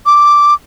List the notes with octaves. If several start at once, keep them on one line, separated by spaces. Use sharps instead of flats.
D6